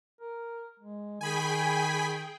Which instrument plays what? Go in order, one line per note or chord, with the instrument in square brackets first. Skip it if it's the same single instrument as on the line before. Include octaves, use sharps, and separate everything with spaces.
[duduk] A#4
G#3
[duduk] D#3 [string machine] G#4 G5 [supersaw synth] G#5 B5 B6